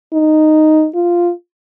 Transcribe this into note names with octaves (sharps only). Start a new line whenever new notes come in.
D#4
F4